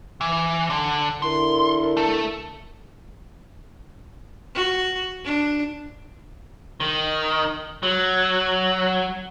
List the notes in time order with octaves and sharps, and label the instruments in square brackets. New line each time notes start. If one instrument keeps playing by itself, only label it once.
[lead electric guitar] E3
D3
[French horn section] D3 E4 A#4 [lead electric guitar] C6
[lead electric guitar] A3 A4
[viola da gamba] F#4
D4
[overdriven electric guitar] D#3
F#3